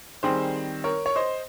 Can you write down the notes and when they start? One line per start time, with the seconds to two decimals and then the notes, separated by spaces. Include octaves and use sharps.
0.23 D#3 G3 C4 G#4 C5
0.84 A#4 C#5
1.06 C#5
1.16 C5 D#5